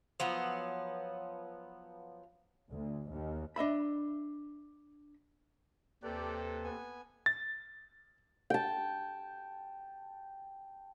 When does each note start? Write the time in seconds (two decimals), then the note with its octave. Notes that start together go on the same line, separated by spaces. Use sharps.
0.20 F3 F#3 B3
2.70 D2
3.10 D#2
3.56 D4 D#5 E5 B5
6.03 D#2 C3 C4 G4 A4 B4 D5
6.64 B3 G#5
7.26 A6
8.50 G5 A5